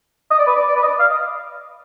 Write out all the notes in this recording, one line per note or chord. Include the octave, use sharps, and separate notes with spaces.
D#5
D5
B4
D5
D5
B4
D#5
D5
F5
D#5